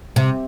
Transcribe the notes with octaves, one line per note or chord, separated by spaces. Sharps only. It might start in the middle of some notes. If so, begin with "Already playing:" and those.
C3